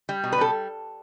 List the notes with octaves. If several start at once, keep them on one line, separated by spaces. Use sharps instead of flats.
G3
B2
B4
G3 A4